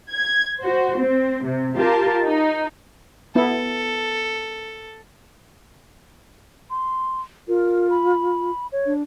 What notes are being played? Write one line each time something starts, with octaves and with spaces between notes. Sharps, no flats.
G#6
F#4 C5
C4
C3
F4 G4 A#4 A5
D#4
B3 E4 A4
C6
F4 A#4
B5
C#5
D4